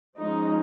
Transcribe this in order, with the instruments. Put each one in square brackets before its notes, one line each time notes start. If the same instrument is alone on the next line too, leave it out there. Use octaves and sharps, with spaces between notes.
[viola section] F3 G#3 C#4 D#4